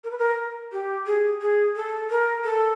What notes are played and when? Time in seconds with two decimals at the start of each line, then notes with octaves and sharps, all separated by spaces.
0.04 A#4
0.11 B4
0.18 A#4
0.72 G4
1.06 G#4
1.41 G#4
1.76 A4
2.10 A#4
2.44 A4